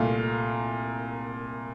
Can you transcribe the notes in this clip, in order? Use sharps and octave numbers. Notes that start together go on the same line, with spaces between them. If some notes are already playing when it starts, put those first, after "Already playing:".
Already playing: C2 A#2 A3 F5